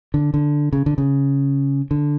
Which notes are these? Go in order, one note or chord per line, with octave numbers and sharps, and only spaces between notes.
D3
D3
C#3
D3
C#3
D3